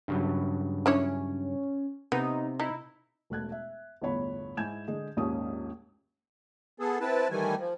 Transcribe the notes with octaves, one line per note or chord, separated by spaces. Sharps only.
G2 C#3 F#3
C#4 D4 E4 C#5
C3 B3 D#4
D#4 E4
E1 A3 F#6 G#6
E5
G1 E2 A2 C#5 B5
G#2 E4 G#5 G6 G#6 E7
D3 G#3 G#4
A#1 D#2 G#2 C#4 G4 D#6
B3 G#4 A4
C4 E4 B4 A5
D#3 E3 G3 A3 G#5
F3